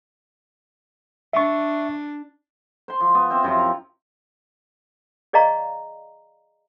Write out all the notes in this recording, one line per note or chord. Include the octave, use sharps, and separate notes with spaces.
D4 E5 C#6
C5 C6
F3
B3
C4 E4 C5
F#2 C3 F3
A#5
G#4 D5 D#5 F5 A#5 C#6